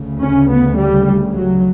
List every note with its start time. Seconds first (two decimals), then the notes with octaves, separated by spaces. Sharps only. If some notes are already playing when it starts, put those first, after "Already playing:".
Already playing: D2 C#3
0.20 C#4
0.48 B3
0.75 G3
1.32 F#3